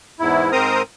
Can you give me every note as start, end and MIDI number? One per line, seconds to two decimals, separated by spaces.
0.20 0.51 40
0.20 0.51 44
0.20 0.51 64
0.52 0.82 44
0.52 0.82 60
0.52 0.82 70
0.52 0.82 72
0.52 0.82 82
0.52 0.82 87